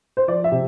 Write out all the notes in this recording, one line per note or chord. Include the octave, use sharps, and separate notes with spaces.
C5
F3 D5
E5
C3